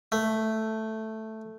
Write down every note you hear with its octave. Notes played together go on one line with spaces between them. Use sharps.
A3